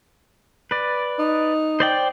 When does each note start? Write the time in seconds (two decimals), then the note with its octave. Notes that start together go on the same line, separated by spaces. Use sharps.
0.71 B4 D5
1.19 D#4
1.80 C5 D5 G5